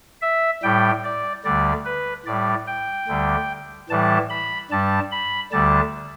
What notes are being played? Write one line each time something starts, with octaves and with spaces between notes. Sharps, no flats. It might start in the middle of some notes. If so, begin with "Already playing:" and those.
E5
A2 G3 G5
D5
D2 D3 G3 D5
B4
A2 G3 D5
G5
D2 D3 G3
A2 E3 G3 A5
B5
G2 G3 A5
B5
D2 D3 G3 A5